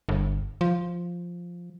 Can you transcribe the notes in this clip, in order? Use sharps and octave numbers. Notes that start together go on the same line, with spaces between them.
G1
F3